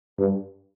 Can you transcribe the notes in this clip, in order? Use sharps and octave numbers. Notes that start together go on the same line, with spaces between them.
G2